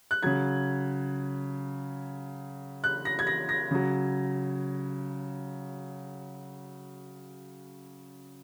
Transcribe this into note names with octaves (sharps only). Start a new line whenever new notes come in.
F#6
C#3 F#3 G#6
F#6
A#6
G#6
A#6
A#6
C#3 F#3